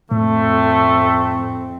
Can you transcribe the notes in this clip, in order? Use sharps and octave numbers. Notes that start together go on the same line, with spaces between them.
F2 A2 A3 C4